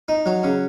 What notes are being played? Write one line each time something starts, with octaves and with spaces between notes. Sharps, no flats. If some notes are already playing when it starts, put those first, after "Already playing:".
D#4
F#3
C#3